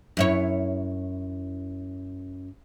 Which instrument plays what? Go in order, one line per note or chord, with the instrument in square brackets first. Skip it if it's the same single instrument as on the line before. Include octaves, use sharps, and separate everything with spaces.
[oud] F#2 E4 C#5